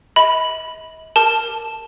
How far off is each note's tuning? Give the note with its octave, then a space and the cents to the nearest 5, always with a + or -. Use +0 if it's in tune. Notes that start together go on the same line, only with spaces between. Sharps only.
D#5 +45 B5 +0
A#4 -10 A5 -5